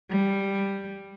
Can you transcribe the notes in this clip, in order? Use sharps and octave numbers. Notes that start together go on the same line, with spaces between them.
G3